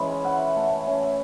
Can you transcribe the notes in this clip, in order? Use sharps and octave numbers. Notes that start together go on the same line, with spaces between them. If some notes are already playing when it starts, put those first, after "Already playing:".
Already playing: E3 G#3 C#4 B5
G#5
E4 F#5
E5
A3 F#5
G#5
C#4 E5
E5